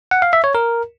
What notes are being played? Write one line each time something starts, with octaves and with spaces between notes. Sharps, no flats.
F#5
F5
E5
C#5
A#4